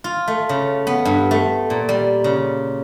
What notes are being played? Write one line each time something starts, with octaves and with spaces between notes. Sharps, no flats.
F4
A3
C#3
B3
G2
A3
A#2
G3
C#3